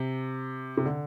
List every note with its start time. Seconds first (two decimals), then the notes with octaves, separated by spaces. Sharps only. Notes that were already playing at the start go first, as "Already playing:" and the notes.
Already playing: C3
0.77 C3
0.86 D3